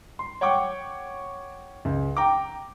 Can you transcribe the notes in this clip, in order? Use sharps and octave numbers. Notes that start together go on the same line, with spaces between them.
C6
C#5 F#5 G5 C#6 D6
C#2
G5 A#5 D6